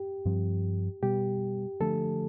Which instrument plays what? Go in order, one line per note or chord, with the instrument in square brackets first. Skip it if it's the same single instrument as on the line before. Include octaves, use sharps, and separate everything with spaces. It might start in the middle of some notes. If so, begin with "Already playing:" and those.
Already playing: [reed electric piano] G4
[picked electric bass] G2 F3 C4
[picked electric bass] B2 G3 B3 [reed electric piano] G4
[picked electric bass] D3 F3 A3 D4 [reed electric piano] A4